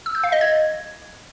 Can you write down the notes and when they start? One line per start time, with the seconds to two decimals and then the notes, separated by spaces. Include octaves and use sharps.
0.06 E6
0.15 G6
0.24 F5
0.32 D#5
0.41 G#6